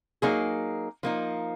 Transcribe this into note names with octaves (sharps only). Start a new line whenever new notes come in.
F#3 A#3 D#4 G#4
F3 A#3 D#4